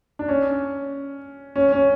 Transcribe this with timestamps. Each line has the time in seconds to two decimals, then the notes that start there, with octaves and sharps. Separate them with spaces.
0.19 D4
0.29 C#4
1.56 C#4
1.72 C#4